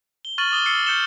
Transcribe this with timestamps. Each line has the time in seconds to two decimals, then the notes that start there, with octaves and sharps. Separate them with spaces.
0.25 G7
0.38 C#6 F6 A6 D#7 F#7
0.52 D6 D#6 G7
0.66 E6 F6 A6 C7 C#7
0.86 F6 G6 C#7 E7 G7